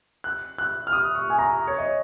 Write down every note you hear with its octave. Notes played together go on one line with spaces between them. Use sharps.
F#6
F#6
F6
D#6
C#6
G#5
A#5
C#5
D#5